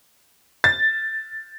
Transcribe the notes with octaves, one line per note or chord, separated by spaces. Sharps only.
A6